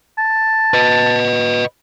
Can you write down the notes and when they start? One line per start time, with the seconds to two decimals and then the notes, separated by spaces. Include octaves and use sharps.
0.18 A5
0.74 B4 D#5